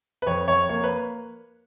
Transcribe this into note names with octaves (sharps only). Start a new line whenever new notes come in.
B4
F2 C#5
F2 C#5
A#3 C#5
B4